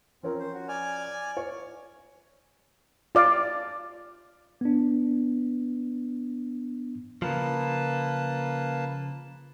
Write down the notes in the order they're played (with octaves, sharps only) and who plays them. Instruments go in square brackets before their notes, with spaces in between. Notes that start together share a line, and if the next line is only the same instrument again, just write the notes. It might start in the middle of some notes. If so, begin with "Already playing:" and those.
[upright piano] F3 C#4 A#4 [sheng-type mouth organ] C4
[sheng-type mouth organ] C5
F#4
D5 G#5 F6
[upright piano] C#5
[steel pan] F4 D5 F5
[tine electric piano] B3 D4
[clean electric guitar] C#3 F3 [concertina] A#3 B4 A5